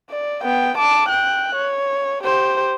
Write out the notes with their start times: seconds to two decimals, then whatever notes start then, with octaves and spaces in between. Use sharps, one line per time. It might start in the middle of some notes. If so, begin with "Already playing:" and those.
0.10 D5
0.43 B3 G5
0.78 A5 D6
1.09 G5 F#6
1.55 C#5
2.23 G4 C5